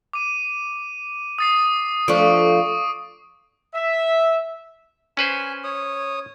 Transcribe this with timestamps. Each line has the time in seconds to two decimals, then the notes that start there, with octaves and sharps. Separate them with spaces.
0.13 D6 D#7
1.39 D#6 A6 C7
2.08 F3 A3 D4 C#6 D#6 D7
3.74 E5
5.17 C#4 B4 C5 G#5
5.64 C#5 D#6